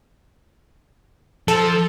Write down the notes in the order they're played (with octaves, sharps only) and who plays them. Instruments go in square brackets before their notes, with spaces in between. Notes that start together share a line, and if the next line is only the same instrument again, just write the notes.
[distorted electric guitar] F3 [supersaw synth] A4